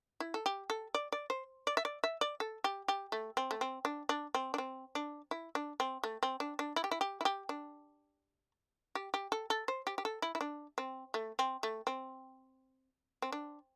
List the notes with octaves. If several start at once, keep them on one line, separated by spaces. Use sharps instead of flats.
E4
A4
G4
A4
D5
D5
C5
D5
E5
D5
E5
D5
A4
G4
G4
A3
C4
A3
C4
D4
D4
C4
D4
C4
D4
E4
D4
C4
A3
C4
D4
D4
E4
G4
E4
G4
E4
G4
D4
G4
G4
A4
A4
C5
G4
G4
A4
E4
E4
D4
C4
A3
C4
A3
C4
C4
D4